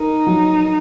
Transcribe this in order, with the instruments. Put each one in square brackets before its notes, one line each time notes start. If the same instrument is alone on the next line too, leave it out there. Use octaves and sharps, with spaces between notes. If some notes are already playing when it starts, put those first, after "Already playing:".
Already playing: [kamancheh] D#4 [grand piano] A#4
[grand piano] F#3